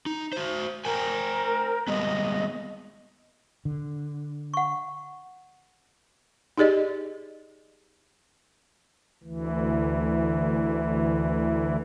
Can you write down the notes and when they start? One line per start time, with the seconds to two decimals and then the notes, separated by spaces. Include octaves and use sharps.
0.06 D#4
0.33 F#4 C5
0.85 A#4 C5 G5 G#5
1.88 G3 G#3 B3 D#5
3.65 D3
4.54 F#5 C#6
6.58 D#4 G4 G#4 D5 D#5
9.23 D2 E3